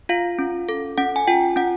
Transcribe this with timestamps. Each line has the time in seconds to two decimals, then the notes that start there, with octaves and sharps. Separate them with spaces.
0.09 F4 F5
0.39 C#4
0.69 A4
0.98 C#4 F#5
1.16 G#5
1.27 F4 G5
1.56 C#4 F#5